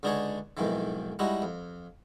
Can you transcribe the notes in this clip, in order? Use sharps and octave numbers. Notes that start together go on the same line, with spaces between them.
C#2 D3 D4 D#4 G#4 C#5
B1 F2 G#2 D#3 E3
G3 G#3 D#4 E4 F#4
F2